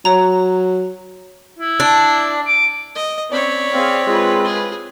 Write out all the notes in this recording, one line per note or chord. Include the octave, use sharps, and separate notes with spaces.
F#3 C#5 A#5
E4
D4
D6
D#5
C4 C#4 C#5 D5 B5
C4 G#4 F5
G#3 F4 B4
G#4